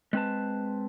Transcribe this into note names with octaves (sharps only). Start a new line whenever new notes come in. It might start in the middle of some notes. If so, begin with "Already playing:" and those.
G#3 C4 B4 A5